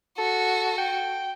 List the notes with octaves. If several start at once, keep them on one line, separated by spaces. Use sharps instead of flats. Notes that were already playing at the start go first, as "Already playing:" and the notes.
F#4 A4
G5